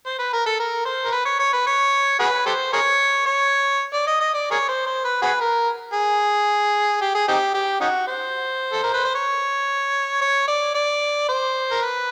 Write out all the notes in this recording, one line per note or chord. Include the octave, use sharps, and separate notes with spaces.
C5
B4
A#4
A4
A#4
C5
A#4
B4
C#5
C#5
B4
C#5
F#4 G#4 B4
G4 A4 C5
G#4 A#4 C#5
C#5
D5
D#5
D#5
D5
G#4 A#4 C#5
C5
C5
B4
F#4 G#4 B4
A#4
G#4
G4
G#4
C4 D#4 G4
G4
C#4 D#4 F#4
C5
A4
A#4
B4
C5
C#5
C#5
D5
D5
C5
A#4
B4